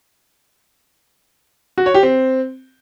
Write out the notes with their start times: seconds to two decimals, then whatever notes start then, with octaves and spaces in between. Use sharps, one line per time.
1.78 F#4
1.86 C#5
1.94 G4
2.03 C4